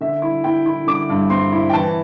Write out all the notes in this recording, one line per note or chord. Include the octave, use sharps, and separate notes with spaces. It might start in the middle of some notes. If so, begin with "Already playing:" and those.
D3 E5
E4
E4 G5
E4
D3 D6
G2
C4 C6
E4
G5
E3 A5